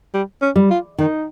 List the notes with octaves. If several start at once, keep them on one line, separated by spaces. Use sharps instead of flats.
G3
C#4
G3
F4
D#3 D#4